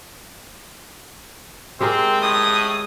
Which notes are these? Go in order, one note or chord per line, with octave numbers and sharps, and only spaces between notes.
G#3 C4 G4 A#4
A2 D#6